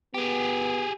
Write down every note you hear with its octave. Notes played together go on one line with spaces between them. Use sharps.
B3 G4 G#4